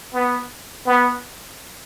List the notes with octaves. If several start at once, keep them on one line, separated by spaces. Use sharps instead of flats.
B3
B3